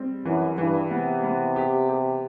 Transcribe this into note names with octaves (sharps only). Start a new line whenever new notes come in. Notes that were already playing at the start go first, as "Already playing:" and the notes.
Already playing: G3 C4
F#2 E3
G2 E3
C3 B3
B3
G4
G4